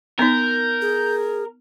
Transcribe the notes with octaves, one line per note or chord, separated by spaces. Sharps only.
B3 D#4 A#4 G6
G#4